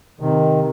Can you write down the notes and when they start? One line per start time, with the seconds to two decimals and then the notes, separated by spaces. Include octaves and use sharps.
0.20 C3 D#3